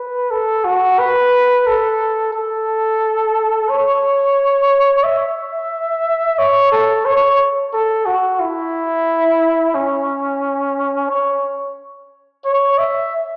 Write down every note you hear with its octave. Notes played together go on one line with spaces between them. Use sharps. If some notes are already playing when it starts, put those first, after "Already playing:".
Already playing: B4
A4
F#4
B4
A4
A4
C#5
E5
C#5
A4
C#5
A4
F#4
E4
C#4
C#5
C#5
E5